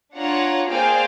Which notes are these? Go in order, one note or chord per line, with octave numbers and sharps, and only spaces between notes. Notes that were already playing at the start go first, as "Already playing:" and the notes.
D4 F4 C#5 F#5 A#5
A#3 G#4 C5 D5 F5 G5